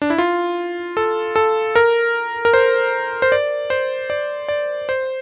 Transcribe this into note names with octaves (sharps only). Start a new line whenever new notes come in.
D4
E4
F4
A4
A4
A#4
A#4
C5
C5
D5
C5
D5
D5
C5